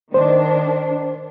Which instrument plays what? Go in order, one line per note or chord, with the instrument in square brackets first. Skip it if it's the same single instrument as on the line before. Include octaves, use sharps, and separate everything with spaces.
[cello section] D#3 D4 [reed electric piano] C5